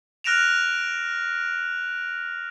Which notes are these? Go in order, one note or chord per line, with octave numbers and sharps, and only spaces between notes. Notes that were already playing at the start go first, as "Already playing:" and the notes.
F6 F#6 A#6 D7 E7 F7